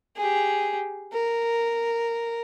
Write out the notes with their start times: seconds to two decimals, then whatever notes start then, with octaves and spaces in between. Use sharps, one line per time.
0.16 G4 G#4
1.13 A#4